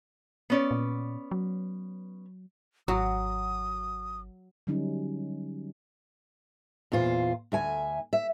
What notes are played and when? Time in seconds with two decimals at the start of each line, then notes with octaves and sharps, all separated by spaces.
0.50 B3 C#4 D5
0.71 A#2
1.31 F#3
2.88 G#1 F#3 F#4 D#6
4.67 D3 F#3 G3 C#4 D#4
6.92 E2 A#2 F4 C5
7.52 D2 E5 G#5
8.13 E5